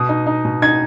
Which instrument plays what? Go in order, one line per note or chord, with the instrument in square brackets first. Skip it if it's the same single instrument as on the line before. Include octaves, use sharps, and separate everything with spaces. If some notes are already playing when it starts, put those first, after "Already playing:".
Already playing: [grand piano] B2 D#6
D#4
D#4
B2
D#4 G#6